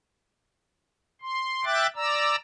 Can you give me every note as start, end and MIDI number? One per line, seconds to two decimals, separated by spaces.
1.22 1.65 84
1.65 1.87 76
1.65 1.87 79
1.65 1.87 86
1.65 1.87 90
1.65 1.87 93
1.96 2.36 74
1.96 2.36 82
1.96 2.36 88